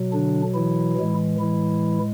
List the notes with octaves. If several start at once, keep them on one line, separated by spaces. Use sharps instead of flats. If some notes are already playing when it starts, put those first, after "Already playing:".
Already playing: B2 F#3
D3 D4
E3 E4
A2 E3 G#3
E3 E4